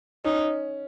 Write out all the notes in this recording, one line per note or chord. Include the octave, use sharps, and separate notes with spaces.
C#4 D#4